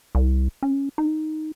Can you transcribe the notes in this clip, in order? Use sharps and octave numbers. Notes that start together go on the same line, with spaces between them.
C2
C#4
D#4